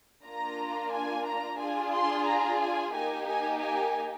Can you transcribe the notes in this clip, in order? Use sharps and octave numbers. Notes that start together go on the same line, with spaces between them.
A#3 D4 F4 A#5
G#5
A#5
D4 F4 G#4 G#5
C6
A#5
G#5
A#3 D#4 G4 G#5
G#5
G#5